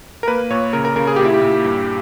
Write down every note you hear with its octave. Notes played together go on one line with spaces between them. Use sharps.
A#4
A#3 B4
A#2 C#5
C#3 A#4
A#4
C#3 A#4
G#4
A#2 G4
E4
G4
A#2
G2